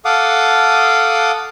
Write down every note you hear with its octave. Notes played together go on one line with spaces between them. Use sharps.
A4 F5 F#5 D6 D#6